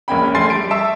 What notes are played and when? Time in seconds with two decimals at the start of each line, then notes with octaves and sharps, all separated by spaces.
0.08 A#1 G#3 A#3 C#4 G5 B5
0.34 A#1 A3 G#5 C6 A6 C7
0.50 G3 D7
0.70 D#5 E5 A5 C#6 E6